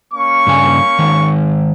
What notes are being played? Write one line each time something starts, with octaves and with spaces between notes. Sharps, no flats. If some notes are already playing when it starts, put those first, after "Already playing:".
A#3 C#4 C#6
G2 C#3 G#5
D#3 G#3